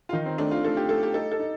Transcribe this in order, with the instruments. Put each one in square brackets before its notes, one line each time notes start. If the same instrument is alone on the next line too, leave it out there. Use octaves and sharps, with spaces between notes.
[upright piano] F4
[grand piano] D#3 [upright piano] D#4
[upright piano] C4
[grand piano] A3 [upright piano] D4
[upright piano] F4
[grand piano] A3 [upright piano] A4
[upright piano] G4
[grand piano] A3 [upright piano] A4
[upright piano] G4
[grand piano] D#4 [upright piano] A4
[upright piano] A4
[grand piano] D#4